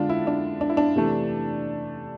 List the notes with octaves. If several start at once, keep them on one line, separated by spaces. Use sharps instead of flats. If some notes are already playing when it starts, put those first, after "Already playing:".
Already playing: D3 G#3 D4 F4
E4
D4
D4
E4
D4
C3 E3 A3